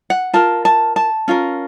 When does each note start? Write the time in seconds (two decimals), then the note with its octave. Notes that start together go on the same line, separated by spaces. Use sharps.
0.10 F#5
0.33 F4 A#4 A5
0.65 A5
0.96 A5
1.28 C#4 F4 A#4